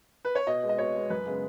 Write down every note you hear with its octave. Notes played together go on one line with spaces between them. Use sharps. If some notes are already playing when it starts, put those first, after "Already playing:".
B4
C#5
B2 D#5
G#3 B3
D#5
B2 C#5
G#3 B3
F#2 B4
C#3 G#3 B3